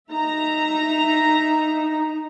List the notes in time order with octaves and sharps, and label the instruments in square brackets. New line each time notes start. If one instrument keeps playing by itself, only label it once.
[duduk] D#4 [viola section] E5 A#5